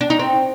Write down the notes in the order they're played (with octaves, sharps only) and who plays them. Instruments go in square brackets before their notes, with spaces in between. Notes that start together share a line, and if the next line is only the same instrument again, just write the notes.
[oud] D4
D#4
C4